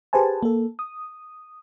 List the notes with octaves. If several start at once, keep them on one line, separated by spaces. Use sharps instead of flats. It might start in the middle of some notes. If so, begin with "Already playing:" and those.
G4 G#4 B4 C5 G#5 A5
A#3 A4
D#6